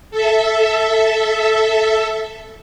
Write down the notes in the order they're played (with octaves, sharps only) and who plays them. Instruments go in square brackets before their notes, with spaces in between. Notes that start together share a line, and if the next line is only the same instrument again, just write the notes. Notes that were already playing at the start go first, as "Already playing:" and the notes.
[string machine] A4 E5